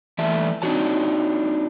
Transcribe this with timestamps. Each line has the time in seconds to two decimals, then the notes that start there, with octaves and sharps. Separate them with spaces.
0.18 E3 A3 D5 E5 A5
0.62 C4 D4 D#4 F#4 C#5 A5